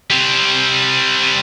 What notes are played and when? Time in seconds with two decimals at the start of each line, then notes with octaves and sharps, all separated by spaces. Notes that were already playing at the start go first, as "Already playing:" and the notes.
0.10 G3 C4